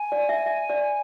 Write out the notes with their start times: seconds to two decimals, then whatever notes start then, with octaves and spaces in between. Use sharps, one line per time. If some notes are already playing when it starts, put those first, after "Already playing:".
Already playing: G#5
0.12 D5
0.29 E5
0.46 E5
0.70 D5